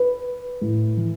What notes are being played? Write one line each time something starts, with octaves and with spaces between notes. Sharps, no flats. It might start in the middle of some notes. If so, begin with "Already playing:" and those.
Already playing: B4
A2
E3